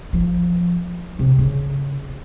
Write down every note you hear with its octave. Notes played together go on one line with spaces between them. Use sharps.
F3
C3
C#3